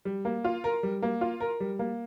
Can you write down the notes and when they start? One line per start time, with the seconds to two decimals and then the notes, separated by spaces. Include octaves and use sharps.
0.05 G3
0.25 A#3
0.44 F4
0.64 A#4
0.83 G3
1.02 A#3
1.21 F4
1.40 A#4
1.60 G3
1.79 A#3